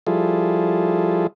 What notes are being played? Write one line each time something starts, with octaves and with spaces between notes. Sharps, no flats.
F3 G3 E4 F4 G#4 A4